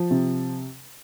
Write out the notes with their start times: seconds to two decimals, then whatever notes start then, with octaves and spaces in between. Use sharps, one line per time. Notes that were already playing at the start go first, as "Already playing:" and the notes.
Already playing: F3
0.11 C3